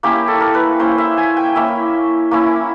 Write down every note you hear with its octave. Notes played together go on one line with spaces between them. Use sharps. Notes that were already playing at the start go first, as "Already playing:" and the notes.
A#3 C#4 E4 G4
A4
A#4
B4
A#3 C#4 E4 C5
E5
G#5
G5
A#3 C#4 E4 E5
A#3 C#4 E4